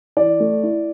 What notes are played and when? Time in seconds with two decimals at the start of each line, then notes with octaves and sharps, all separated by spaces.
0.17 E3 D5
0.40 A3
0.63 E4